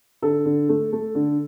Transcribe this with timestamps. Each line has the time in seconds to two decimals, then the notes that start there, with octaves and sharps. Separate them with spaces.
0.22 D3 A4
0.46 D3
0.69 A3
0.93 A3
1.15 D3